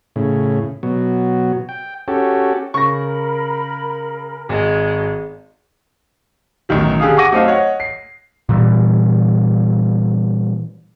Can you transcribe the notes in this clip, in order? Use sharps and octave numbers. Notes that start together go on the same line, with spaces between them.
A2 C#3
B2 F#3
G5
C#4 F#4 G4 A4
C#3 A#4 B5 C#6 A#6
G#1 G#3 F#4
A1 B2 D#3 F#3
D3 G4 G#4 F5 D#6
F#5 C#6 D6 A#6 D#7
F#3 A3 C4 D#4 F5
C#5 D#5 F#5
C7
A#2 E3 G3